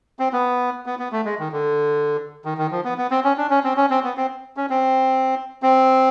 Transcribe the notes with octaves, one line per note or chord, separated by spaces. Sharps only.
C4
B3
B3
B3
A3
G#3
D#3
D3
D#3
D#3
F3
B3
B3
C4
C#4
D4
C#4
C4
C#4
C4
B3
C4
C#4
C4
C4